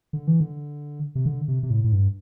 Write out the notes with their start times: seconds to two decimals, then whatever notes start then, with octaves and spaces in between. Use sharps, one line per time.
0.13 D3
0.27 E3
0.40 D3
1.15 C3
1.26 D3
1.48 C3
1.63 C3
1.70 A2
1.84 A2
1.92 G2